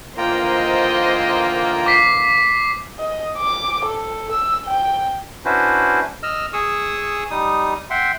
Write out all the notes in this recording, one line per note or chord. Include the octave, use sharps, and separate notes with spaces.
D3 E3 A#3 F4 C5 D#5 G5 A#5
D6 B6 C7
D#5
D6
A4
E6
G5
C#4 D4 E4 F#4 B4 C5
D#5 E6 F6
G#4 C#6 D#6 E6
G3 D#4 D#6
E5 F#5 G5 C6